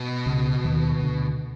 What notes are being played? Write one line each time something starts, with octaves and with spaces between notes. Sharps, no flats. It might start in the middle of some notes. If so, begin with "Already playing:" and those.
Already playing: B2
C#2 C#3
D#2 D#3
D2 D3